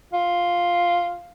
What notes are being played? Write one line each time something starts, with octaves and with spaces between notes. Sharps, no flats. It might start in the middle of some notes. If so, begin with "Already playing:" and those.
F4